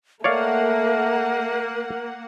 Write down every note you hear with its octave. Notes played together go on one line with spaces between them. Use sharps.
A3 A#3 A#4 C#5 D5 F5 F#5